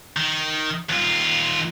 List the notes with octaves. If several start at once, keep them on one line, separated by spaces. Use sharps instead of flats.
D#3
D#2 F4